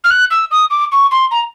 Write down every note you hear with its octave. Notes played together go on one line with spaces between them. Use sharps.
F6
F#6
E6
D#6
D6
C#6
C6
A#5